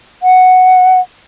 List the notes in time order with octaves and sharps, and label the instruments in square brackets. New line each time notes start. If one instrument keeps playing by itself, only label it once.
[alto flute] F#5